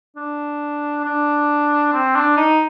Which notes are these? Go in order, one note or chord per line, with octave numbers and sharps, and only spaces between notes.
D4
D4
C4
D4
D#4